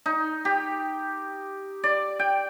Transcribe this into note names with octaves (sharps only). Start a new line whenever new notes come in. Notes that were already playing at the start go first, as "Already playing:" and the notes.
D#4
G4
D5
G5